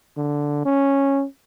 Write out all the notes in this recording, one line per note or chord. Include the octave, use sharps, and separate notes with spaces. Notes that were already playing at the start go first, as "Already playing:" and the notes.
D3
C#4